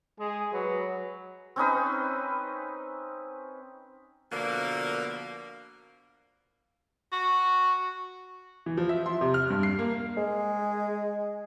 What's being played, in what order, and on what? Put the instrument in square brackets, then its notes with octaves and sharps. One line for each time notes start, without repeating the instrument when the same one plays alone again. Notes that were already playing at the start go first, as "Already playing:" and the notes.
[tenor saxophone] G#3 [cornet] G#4
[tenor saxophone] F#3 [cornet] B4
[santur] C4 C#4 D#4 B4
[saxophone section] B2 D3 F3 A#3
[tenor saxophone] F#4
[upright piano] E3
F3
E5
C6
C3
F6
G2
C7
A#3
[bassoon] G#3